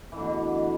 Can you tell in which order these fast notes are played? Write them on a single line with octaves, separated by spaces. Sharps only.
E3 D3 B2